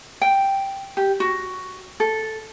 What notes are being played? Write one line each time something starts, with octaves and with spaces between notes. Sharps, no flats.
G5
G4
F#4
A4